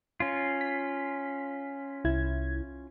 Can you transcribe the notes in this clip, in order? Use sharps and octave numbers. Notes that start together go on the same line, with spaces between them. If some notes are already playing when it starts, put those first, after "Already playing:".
C#4 F4
B6
C2 E4 G#6